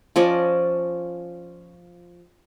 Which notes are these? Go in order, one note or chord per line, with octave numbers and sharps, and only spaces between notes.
F3 C#4 D5 D#5